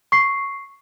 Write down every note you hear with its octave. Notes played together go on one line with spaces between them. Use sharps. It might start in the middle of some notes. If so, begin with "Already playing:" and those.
C#6 C7